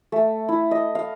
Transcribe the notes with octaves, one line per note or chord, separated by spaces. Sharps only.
A3
E4
D#5
F5